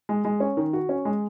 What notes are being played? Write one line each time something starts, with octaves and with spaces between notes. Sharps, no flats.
G#3
G#3
C#4
D#3
F#4
C#4
G#3